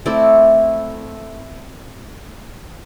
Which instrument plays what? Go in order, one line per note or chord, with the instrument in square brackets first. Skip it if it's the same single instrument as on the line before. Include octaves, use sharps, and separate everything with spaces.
[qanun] A3 C4 E4 D5